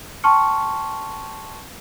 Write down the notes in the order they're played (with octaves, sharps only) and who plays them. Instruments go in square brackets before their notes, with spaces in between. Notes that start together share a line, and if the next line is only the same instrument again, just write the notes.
[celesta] G5 A5 C6 C#6 F6 C#7